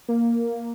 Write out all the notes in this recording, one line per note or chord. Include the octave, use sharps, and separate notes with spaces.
A#3